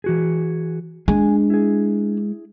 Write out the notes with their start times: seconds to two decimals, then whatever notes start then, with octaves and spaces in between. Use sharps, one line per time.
0.04 E3 F#4 G#4
1.08 G#3 D4 G#5
1.50 E4 G#4